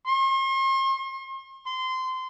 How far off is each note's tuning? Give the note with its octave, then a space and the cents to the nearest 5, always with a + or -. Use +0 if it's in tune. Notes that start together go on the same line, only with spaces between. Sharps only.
C6 +45
C6 -20